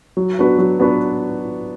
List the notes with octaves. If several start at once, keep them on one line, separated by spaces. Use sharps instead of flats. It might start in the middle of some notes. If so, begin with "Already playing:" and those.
F#3
B3 D4 F#4 B4
F#3
B3 D4 F#4 B4